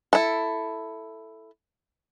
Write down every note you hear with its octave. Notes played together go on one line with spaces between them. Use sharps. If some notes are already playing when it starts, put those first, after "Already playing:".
E4 A4